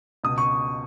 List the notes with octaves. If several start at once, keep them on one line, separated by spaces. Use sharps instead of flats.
C#2 B2 D#6
C#6